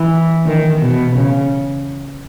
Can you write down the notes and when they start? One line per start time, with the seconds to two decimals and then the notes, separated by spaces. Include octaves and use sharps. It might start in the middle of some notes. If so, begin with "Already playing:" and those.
Already playing: E3
0.46 D#3
0.82 B2
1.16 C#3